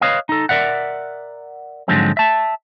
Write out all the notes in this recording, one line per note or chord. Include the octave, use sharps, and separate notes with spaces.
B4 C#5 D#5 F5
D#4 A4
A#4 D5 E5 F#5
G#2 D3 F3 F#3 G#3 C4
E5 A5